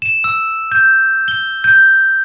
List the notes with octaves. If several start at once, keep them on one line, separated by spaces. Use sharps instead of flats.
E7
E6
G6
G7
G6